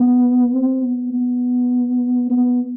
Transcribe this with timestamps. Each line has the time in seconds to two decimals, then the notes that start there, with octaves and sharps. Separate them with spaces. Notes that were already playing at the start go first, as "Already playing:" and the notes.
Already playing: B3
0.55 C4
0.84 B3
1.13 B3
2.30 B3